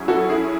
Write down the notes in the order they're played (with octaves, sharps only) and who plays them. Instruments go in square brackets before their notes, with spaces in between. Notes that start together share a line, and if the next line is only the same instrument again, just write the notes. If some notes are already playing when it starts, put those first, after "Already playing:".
Already playing: [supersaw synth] F#3 C#4 E4 G#4
[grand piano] F#4 A4
E4 G#4